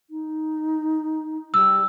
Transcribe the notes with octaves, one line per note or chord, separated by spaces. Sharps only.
D#4
G3 E6